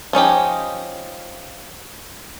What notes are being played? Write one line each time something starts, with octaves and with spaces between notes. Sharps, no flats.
F3 C#4 D#4 G4